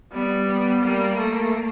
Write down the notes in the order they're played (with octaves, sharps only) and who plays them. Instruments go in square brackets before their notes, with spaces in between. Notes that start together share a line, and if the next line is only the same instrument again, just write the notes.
[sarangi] G3 [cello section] B3
[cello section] B3
[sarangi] G3 [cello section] A#3
[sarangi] A3